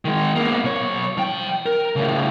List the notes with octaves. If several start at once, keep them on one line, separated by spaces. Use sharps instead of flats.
D#3 G#3
A#3 B3
B1 C#5
F3 G5
A#4
A2 C#3